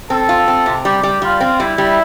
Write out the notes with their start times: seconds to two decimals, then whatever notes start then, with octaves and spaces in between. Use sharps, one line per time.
0.10 C4 A4
0.29 F4
0.48 C4
0.66 C3
0.85 G3 G4
1.03 G3
1.22 G3 F4
1.40 C4
1.60 G3 E4
1.78 G3